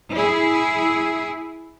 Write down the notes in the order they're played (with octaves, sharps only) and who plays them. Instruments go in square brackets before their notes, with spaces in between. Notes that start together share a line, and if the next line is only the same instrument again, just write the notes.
[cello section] E4 G#4